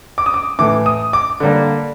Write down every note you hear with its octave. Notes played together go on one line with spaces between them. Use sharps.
D6
D#6
D6
A2 E3 A3 D6
D#6
D6
D3 G3 A#3